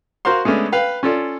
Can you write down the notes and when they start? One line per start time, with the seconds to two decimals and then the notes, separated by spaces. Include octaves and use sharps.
0.25 F#4 A#4 C5 F5 C6
0.45 G#3 A3 B3 C#4 D4
0.72 B4 F5 G5
1.03 C#4 F4 A4 D5